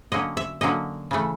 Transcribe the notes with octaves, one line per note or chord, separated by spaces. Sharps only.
D3 F#3 A#3 C#4 D#5
E5
D3 F#3 A#3 C#4 D#5
C#3 E3 A3